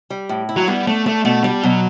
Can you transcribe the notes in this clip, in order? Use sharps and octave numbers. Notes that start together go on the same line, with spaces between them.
G3
A2
E4
F#3
G3 B3
A3 D4
A3 D4
B2 A3
G3 D4
B2 F#3